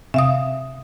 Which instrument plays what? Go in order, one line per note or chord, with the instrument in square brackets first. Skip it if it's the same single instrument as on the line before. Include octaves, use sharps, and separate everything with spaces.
[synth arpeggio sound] C3 [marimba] E5 F5 D#6